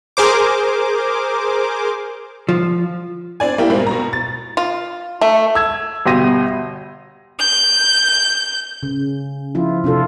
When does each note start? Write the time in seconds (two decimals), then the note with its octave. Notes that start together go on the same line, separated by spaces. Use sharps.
0.17 G#4 A#4 C5 D6
2.49 F3
3.40 C4 D4 D5 G#5
3.58 A#3 E4 G4
3.70 G#2 B2 G3 A#3 C4
3.87 B2 A#5
4.13 A6
4.57 F4
5.21 A3
5.55 E6 G#6
6.06 G1 B2 G4 C6 A#6 D#7
7.39 G6
8.83 C#3
9.55 F3 E4 F4
9.84 C3 D4 F4 A4